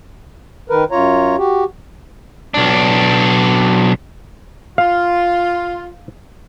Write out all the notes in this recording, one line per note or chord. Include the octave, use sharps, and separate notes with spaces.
D#3 A#4 B4
F#2 F4 C#5 A#5
F#4 G4
B1 D4
F4 F5